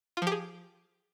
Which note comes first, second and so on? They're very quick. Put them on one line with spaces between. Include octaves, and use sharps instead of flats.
F4 F3 G4 G#4